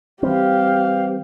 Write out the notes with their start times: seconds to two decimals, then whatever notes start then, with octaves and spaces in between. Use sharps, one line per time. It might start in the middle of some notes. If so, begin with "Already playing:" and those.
0.23 E3 G3 C4 G4 F5